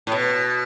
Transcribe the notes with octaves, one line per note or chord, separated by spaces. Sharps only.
A2
B2